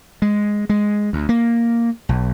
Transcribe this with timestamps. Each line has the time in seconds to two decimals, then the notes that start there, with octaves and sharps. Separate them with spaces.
0.22 G#3
0.69 G#3
1.13 D2
1.29 A#3
2.09 B1